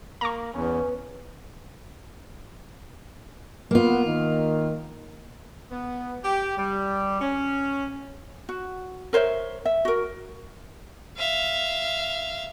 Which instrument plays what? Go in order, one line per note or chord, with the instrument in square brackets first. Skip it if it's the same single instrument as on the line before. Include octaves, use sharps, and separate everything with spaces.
[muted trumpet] A#3 [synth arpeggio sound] A#5 C#6
[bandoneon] E2 [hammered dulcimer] B3 [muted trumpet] C#4
[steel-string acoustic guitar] A#3 F4 [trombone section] B3
[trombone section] D#3
[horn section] B3
G4
G3
C#4
[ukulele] F#4
A#4 C5 C#5 E5
E5
F#4 A#4
[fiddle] E5 F5